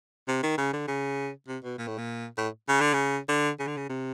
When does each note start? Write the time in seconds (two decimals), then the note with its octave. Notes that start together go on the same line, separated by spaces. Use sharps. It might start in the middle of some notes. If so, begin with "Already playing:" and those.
0.28 C3
0.43 D#3
0.57 C#3
0.73 D3
0.87 C#3
1.47 C3
1.63 B2
1.78 A#2
1.87 A2
1.98 A#2
2.38 A2
2.68 C#3
2.81 D3
2.93 C#3
3.29 D3
3.59 C#3
3.67 D3
3.77 C#3
3.89 C3